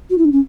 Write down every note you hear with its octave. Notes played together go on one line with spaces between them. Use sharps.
F#4
E4
D4
C#4